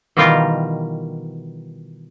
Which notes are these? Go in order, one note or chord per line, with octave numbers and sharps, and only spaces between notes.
B2 D#3 E3 G3 F4 A#4